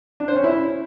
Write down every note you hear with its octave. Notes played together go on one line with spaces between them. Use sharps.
D4
C5
C#4
E4